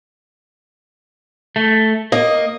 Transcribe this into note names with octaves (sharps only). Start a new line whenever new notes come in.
A3
A#3 D#5